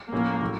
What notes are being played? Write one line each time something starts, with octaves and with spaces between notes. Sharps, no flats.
A2 F3 A3 A#3 C#4
A2 F#3 A3